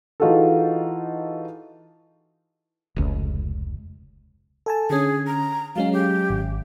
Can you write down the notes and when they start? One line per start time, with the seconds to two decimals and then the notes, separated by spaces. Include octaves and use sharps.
0.20 E3 D#4 F4 F#4 G#4 A4
2.96 F1 C#2
4.66 A4 G#5 A5
4.90 D3 C#4 G#4
5.27 A#5
5.76 F#3 G#3 C#4 F5
5.93 G4
6.30 G#1